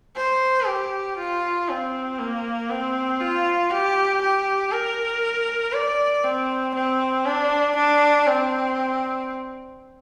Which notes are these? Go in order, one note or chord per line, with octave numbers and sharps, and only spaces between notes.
C5
G4
F4
C4
A#3
C4
F4
G4
G4
A#4
D5
C4
C4
D4
D4
C4